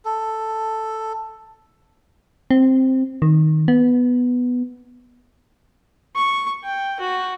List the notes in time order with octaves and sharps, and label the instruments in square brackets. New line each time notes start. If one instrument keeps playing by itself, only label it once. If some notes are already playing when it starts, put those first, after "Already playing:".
[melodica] A4
[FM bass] C4
D#3
B3
[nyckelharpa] C#6
G5
F#4